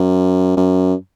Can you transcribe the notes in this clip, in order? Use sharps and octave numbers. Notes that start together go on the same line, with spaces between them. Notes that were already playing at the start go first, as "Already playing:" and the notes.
Already playing: F#2
F#2